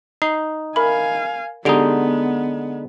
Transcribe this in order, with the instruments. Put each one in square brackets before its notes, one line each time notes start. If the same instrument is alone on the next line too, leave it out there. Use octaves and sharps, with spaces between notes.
[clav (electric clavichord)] D#4 [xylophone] C7
[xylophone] A#4 E5 B5 [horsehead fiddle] F5 G#5
[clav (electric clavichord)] D3 G#3 D#4 [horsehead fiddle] B3 [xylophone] G4 D7 F7